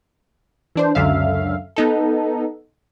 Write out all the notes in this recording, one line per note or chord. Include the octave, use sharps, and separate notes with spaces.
E3 D4 C5
C#2 F#2 D3 E5 F5
B3 D#4 A4